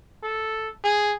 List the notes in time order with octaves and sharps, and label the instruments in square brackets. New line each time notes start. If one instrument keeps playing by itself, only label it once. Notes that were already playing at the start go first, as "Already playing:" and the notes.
[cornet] A4
G#4